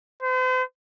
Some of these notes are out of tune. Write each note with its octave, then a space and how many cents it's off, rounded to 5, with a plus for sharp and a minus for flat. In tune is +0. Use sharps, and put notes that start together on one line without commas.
C5 -40